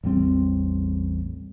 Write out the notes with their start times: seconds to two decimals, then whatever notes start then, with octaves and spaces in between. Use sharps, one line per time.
0.04 A1 E2 G3 C4